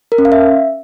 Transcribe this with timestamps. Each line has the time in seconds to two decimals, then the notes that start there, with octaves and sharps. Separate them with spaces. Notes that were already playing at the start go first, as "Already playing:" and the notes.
0.12 A#4
0.18 C#4
0.25 F5
0.32 E5